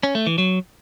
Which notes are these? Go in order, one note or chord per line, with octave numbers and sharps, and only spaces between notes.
C#4
A3
E3
F#3